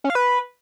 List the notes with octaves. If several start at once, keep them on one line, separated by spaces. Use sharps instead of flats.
C#4
F5
B4